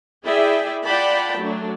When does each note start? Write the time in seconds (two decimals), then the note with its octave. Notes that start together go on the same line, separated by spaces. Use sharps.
0.24 E4 G#4 D5 E5 G5
0.85 F4 D5 F#5 G5 A5 B5
1.40 F#3 A3 D4